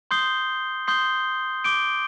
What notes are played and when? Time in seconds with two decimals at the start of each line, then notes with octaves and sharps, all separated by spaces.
0.11 C6 D#6 G6 C7 G7
0.87 C6 D#6 G6 C7 G7
1.64 D6 G6 D7 G7